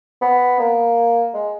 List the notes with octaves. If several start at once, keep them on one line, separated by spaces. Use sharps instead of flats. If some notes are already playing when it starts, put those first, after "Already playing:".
B3
A#3
G#3